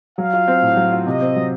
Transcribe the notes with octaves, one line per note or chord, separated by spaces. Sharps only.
F#3 F5
F4
C4
A2
F#3
F4
C3 D#5
C4
F#3